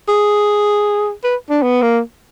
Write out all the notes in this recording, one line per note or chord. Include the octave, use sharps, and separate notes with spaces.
G#4
B4
D4
B3
A#3